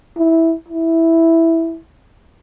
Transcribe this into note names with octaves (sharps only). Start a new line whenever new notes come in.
E4
E4